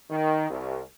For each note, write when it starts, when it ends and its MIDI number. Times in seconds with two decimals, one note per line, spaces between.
0.10 0.46 51
0.48 0.80 36